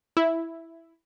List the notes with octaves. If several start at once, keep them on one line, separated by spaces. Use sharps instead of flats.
E4